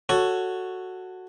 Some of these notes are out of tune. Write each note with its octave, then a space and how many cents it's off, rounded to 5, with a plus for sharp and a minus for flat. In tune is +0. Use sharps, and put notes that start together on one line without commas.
F#4 +0 A4 +10 C#5 +0